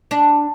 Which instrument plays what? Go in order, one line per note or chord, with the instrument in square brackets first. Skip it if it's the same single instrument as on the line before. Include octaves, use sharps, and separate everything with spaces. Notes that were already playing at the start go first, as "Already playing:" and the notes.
[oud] D4